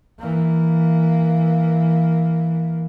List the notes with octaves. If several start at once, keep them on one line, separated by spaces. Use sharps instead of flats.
E3 A#3